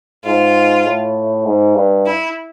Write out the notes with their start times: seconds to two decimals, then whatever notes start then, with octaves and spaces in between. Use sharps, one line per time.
0.24 G#2 F4
0.85 A2
1.45 G#2
1.75 G2
2.06 E4